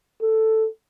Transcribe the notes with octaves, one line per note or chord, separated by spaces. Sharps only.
A4